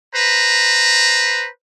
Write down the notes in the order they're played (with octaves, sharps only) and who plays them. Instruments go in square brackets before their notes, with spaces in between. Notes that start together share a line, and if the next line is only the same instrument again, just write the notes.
[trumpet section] B4 C5 A#5